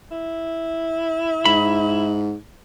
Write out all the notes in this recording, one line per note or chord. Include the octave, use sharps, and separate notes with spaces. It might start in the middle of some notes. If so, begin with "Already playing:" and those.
E4
G#2 B5